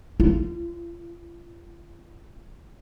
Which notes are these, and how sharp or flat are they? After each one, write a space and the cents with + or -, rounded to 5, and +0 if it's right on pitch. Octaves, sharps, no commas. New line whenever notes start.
F4 -35